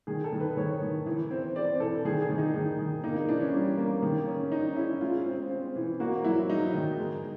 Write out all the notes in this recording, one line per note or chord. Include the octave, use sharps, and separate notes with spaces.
D#3 G#4
A4
D#3
B4
D#3 C#5
D#3
E3
C4
C4 D5
E3 A4
D#3 G#4
G#4
D#3
D#4
D#3
D#3
A#3 D#4
D#4
E3 D4
C#4
G3
A#3
D#3
C#4
C#4 D#4
C#4 E4
G#3 F4
C4
C4
E3
A#3 F#4
F#3 E4
F#3 D#4
D#3
G#3